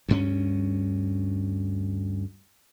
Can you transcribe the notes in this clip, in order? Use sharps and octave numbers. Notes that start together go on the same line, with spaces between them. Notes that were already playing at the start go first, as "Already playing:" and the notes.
D2 G2 C#4